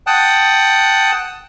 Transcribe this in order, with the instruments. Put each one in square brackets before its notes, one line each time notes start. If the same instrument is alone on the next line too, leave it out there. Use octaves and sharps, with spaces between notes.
[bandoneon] F#5 G5 A5 D#6 F#6